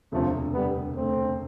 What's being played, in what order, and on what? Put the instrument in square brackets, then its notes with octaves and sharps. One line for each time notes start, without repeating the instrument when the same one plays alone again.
[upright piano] E1 D2 C3 [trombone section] F3 A3
[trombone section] G3 B3
A3 C4